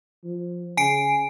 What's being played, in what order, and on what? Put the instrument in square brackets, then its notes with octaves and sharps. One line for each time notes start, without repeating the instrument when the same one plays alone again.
[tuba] F3
[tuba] C#3 [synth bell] G#5 C7 D7